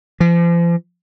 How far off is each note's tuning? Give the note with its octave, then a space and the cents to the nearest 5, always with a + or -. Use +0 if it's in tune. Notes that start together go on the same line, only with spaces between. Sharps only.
F3 -40